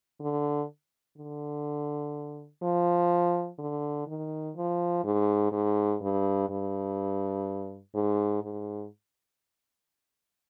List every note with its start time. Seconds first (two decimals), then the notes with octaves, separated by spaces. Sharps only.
0.20 D3
1.17 D3
2.62 F3
3.59 D3
4.07 D#3
4.56 F3
5.04 G#2
5.52 G#2
6.01 G2
6.49 G2
7.95 G#2
8.42 G#2